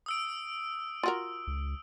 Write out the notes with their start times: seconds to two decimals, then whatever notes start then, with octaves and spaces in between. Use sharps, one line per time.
0.06 D#6 E6 D7
1.03 F4 F#4 A#4
1.47 C#2